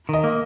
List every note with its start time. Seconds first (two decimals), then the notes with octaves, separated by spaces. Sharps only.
0.09 D#3 D#5
0.24 A#3